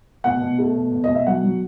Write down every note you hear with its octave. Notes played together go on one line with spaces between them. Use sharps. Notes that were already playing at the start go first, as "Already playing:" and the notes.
B2 F#5
B2
A3
B2
B2
D#5
B2
E5
F#3 F#5
F#3